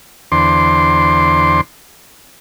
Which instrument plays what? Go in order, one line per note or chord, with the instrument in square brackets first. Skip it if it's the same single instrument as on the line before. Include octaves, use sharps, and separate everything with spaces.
[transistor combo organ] E2 D3 C5 C6 D6